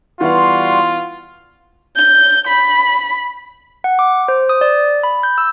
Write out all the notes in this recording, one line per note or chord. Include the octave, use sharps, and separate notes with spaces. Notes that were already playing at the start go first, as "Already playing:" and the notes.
E3 G3 B3 F4 F#4 F5 F#5 C6
G6
B5
F#5
D6
C5
D#6
D5
B5
G6
E6